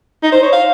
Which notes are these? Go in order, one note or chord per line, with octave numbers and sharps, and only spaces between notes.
D#4
C5
C#5
F5